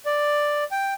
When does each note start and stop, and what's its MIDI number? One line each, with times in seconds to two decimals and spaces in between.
0.06 0.64 74
0.72 0.94 79